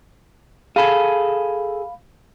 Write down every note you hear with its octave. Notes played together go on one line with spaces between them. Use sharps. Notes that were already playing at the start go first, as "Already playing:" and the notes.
G#4 A4 F5 B5